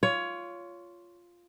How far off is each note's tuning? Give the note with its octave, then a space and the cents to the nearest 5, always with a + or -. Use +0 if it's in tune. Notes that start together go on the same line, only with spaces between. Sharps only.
F4 +0 C#5 +20